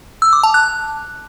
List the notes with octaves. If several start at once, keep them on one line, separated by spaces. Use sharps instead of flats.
E6
D6
A5
F#6